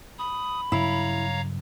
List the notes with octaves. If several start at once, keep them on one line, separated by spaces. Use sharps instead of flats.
B5 D#6
G2 C#3 F#3 E4 C#5 F5 A#5